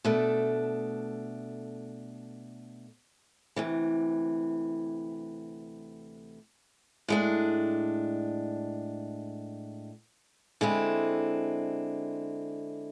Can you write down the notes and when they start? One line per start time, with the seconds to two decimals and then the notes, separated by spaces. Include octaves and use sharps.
0.05 B2 A3 D4
3.56 D2 C3 E3
7.08 A2 G#3 D4
10.61 D3 G#3 C4 E4